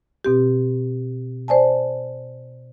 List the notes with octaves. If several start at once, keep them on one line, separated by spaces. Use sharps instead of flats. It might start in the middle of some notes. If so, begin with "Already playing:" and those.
B2 C4 G4
C5 D5 G#5 A5